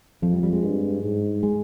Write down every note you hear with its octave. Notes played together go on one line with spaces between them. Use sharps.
F2 F3
G3
G3
G#3
G2
G#2
G#3